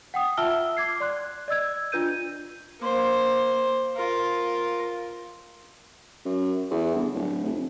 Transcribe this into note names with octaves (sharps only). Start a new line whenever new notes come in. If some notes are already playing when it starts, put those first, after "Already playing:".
F#5 G5 D#6
F4 E5 A5 E6 F6 G7
D6 G#6 C7
D5 C6 F#6
D5 D#5 E6 G#6
D4 F4 B4 G6 D#7
A#3 C5
F4 A#4
F#2
E2
G1
D1
F1